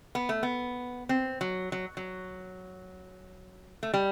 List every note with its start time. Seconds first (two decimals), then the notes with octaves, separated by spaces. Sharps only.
0.15 B3
0.29 A3
0.43 B3
1.09 C4
1.41 F#3
1.72 F#3
1.97 F#3
3.83 A3
3.94 G3